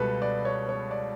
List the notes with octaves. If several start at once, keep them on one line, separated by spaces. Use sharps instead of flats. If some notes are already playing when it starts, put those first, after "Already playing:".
Already playing: C#2 B2 G3 A4 B4
D5
C#5
C#5
D5